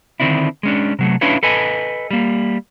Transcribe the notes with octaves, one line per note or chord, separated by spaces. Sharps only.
D3 D#3 F3 C4 D4 E4
G#3 C#4 D4
C3 F#3 A3
C#4 D4 E4 F4 B4 C#5
A4 B4 D#5 G#5
G3 A#3